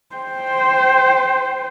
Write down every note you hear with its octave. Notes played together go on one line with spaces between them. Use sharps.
C5 G5